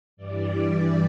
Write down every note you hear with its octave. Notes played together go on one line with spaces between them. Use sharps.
G2 E3 G3 D5